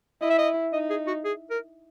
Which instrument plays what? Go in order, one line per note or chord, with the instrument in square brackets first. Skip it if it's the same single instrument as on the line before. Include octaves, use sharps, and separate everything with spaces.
[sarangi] E4 [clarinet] D#5
[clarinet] E5
D#5
[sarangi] D#4 [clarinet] D#5
[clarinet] G#4
F#4
G#4
A#4